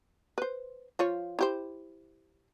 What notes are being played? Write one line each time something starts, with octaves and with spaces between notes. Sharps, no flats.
B4 C5
F3 F4 C#5
E4 G4 C5